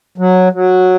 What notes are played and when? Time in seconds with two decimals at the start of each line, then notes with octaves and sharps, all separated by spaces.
0.18 F#3
0.53 F#3